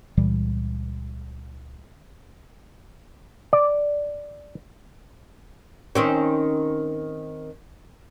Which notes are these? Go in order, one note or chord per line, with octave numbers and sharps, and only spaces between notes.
C#2 A#2 E3 G3
D5
D#3 C4 C#4